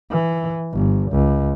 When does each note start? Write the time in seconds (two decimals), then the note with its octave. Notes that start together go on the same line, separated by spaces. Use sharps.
0.11 E3
0.73 G1
1.12 C#2